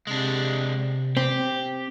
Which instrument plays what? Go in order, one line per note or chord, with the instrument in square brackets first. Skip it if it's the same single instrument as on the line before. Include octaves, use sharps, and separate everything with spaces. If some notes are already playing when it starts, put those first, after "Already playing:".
[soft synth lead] C3 [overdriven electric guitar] G#3 D4
[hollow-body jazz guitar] C4 [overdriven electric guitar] G4